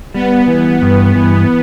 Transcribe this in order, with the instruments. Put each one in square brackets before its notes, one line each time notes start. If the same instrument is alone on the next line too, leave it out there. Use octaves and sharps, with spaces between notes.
[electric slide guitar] G3 [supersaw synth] B3
[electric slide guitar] E3
G2
E3